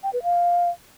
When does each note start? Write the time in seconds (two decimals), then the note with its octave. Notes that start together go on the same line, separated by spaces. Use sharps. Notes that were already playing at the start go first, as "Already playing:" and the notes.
0.03 G5
0.13 B4
0.23 F5